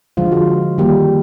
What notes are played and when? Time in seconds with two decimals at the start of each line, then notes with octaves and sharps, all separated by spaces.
0.17 D3 F3 G#3 F4
0.32 F#4
0.78 D#3 G3 A#3 G4